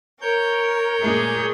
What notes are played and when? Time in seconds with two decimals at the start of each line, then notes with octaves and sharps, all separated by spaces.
0.21 A#4 C#5 G6
1.02 A#2 G#3 A3 G#4